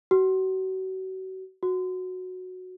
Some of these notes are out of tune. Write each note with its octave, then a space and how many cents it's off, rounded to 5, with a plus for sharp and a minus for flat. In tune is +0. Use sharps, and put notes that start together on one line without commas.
F#4 +35
F#4 -10